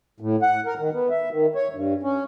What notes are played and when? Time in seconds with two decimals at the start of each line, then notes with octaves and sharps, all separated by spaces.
0.20 A2
0.42 F#5
0.66 A#4
0.79 D#3
0.93 B3
1.10 E5
1.31 D#3
1.55 C#5
1.74 G2
2.03 C#4